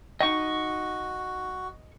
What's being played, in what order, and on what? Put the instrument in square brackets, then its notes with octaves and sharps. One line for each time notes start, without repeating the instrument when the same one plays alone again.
[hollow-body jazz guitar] D#4 G5 [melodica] F#4 [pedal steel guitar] D#5 C#6